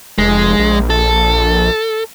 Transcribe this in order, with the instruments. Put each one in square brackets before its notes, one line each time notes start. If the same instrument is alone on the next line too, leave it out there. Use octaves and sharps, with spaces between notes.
[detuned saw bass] F1 [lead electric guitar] G#3
[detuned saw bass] A#1
[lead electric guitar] A4